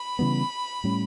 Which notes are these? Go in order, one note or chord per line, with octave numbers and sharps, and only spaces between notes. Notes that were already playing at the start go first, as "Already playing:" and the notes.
Already playing: B5
C#3 E3 G3 B3
A2 G3 C#4